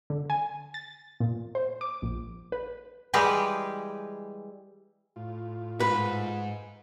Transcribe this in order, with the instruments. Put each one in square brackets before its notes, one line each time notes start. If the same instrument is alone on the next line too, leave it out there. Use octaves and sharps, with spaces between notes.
[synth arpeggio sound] D3
G#5
A6
A#2
C5
D6
A#1
B4
[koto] E3 G3 G#3 G4 G#4 B4
[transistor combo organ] A2 F4
[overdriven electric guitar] G#2 [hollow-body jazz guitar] B4